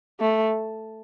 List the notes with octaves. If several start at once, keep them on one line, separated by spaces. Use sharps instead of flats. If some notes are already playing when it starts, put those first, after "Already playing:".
A3